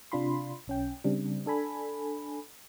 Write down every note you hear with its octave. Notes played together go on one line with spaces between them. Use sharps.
C3 D4 F4 B5 C6
B1 C#4 G5
C#3 G3 C4 D4
D4 A4 G#5 B5